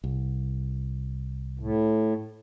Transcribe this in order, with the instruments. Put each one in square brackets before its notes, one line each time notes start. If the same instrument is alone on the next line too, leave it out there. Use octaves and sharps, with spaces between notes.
[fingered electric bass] C2
[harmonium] A2